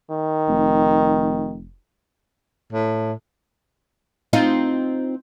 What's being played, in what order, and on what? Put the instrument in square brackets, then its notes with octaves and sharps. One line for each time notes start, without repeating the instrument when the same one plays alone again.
[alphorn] D#3
[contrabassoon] F1
[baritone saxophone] A2
[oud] C4 D#4 F4